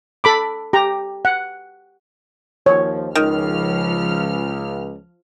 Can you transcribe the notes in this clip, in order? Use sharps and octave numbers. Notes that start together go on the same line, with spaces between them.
A4 B5 D6
G4 A#5
F#5
D#2 F3 C#5
C#2 D#3 F3 F6